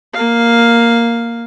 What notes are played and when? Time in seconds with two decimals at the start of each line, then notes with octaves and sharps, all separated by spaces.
0.13 A#3 F5